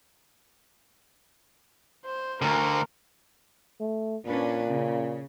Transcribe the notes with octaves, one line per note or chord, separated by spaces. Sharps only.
C5
D2 D3 A#4
A3
A#2 C#4 D4 B4
C#3